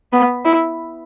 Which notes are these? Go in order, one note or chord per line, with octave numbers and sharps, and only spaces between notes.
B3
E4